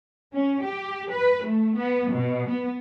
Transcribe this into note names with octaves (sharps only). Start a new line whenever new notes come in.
C#4
G4
B4
A3
B3
B2
B3